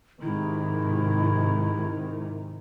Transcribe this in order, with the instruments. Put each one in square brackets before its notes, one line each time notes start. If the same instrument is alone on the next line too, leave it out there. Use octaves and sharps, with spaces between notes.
[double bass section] G#2 C3 D#3 [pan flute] E4